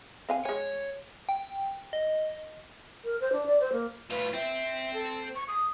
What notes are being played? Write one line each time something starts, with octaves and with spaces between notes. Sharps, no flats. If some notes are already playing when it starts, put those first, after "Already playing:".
C4 F5 G#5
G#3 C#5 G#5
G5
D#5
A#4
C5
D4
D5
C5
A#3
A2 F4 B4
C4 E5
A4
C#6
D#6